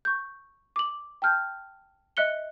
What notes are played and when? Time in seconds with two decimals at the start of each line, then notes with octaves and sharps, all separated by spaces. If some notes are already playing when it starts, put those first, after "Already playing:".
0.05 C#6 G6
0.76 D6 F#7
1.22 G5 A5 F6 G6
2.17 D#5 E5 F#6 C#7 G7